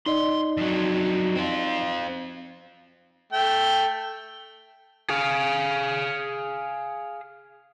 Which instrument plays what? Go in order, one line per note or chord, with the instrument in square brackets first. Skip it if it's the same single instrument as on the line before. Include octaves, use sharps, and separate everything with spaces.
[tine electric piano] D#4 D5 D#5 [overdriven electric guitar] C6
[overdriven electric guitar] F2 F#3
C4 F4
[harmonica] A3 G5
[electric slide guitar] G#4 F5